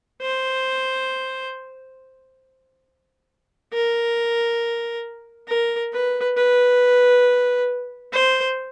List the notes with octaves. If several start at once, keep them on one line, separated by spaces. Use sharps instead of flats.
C5
A#4
A#4
B4
B4
C5